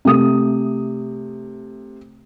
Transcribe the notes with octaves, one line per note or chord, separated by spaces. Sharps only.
C3 A3 D#6